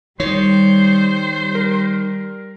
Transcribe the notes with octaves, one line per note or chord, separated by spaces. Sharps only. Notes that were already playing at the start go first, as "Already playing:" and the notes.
D#3 G3 C5 C#5
A#4